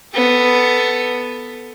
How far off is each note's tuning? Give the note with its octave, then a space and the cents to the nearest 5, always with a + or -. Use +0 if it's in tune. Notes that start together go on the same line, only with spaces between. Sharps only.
B3 +5 A4 +0